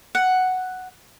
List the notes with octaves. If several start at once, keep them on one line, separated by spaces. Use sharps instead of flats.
F#5